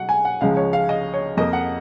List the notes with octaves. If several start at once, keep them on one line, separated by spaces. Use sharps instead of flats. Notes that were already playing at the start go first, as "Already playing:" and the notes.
Already playing: B2 F#3 F#5
G#5
F#5
C#2 C#3 F3 G#3 F5
C#5
F5
D#5
C#5
F2 F3 A#3 D#5
F#5